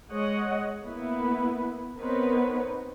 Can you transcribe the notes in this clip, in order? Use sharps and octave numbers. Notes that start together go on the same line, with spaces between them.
G#3 C#5 D#5 F#5
A#3 B3 E4 B4
B3 C4 D#4 A#4 B4 C#5